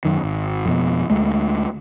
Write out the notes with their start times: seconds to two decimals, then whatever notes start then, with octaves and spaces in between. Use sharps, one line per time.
0.05 F#2 D#3
0.23 G#1
0.66 F2 B2
1.10 D2 D3 G#3 A3